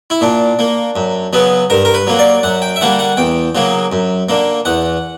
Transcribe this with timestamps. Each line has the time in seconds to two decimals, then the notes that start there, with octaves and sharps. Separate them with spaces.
0.10 E4
0.21 A#2 D4
0.59 A#3
0.96 F#2
1.33 C#3 F#3 B3
1.70 G2 A#4
1.85 A#4
1.94 B4
2.07 F#3 A#3
2.19 D5
2.43 F#2 F#5
2.62 G5
2.76 E5
2.81 D3 G3 A#3 F#5
2.99 F#5
3.17 E2 G5
3.55 C#3 F#3 A#3
3.92 F#2
4.29 D3 A#3
4.65 E2 F#5